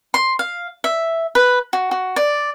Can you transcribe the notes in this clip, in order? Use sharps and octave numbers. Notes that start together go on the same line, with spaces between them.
C6
F5
E5
B4
F#4
F#4
D5